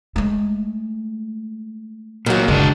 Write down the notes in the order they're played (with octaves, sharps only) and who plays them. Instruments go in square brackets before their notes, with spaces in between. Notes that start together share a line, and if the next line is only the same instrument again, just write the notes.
[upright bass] G#3 A3
[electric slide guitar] A#2 F#3 [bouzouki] D#3 F#4
[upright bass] F#1 D3 [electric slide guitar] G#3 D4